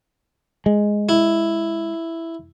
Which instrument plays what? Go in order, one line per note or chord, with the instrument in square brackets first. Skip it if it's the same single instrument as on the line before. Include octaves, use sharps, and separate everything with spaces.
[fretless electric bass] G#3
[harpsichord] E4